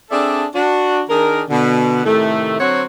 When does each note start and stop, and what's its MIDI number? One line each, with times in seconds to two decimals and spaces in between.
0.11 0.46 60
0.11 0.46 62
0.11 0.46 68
0.11 0.46 69
0.11 0.46 74
0.11 0.46 76
0.55 1.01 62
0.55 1.01 66
1.09 1.43 51
1.09 1.43 62
1.09 1.43 68
1.09 1.43 70
1.50 2.04 47
1.50 2.04 50
1.50 2.04 59
2.05 2.58 45
2.05 2.58 48
2.05 2.58 51
2.05 2.58 57
2.60 2.84 50
2.60 2.84 54
2.60 2.84 60
2.60 2.84 66
2.60 2.84 72
2.60 2.84 73